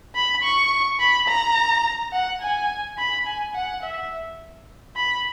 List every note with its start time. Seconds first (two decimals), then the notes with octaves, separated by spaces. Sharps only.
0.15 B5
0.43 C#6
1.00 B5
1.28 A#5
2.13 F#5
2.42 G#5
2.98 B5
3.27 G#5
3.55 F#5
3.83 E5
4.96 B5